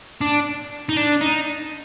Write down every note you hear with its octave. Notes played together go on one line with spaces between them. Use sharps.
D4
D#4
D4
D#4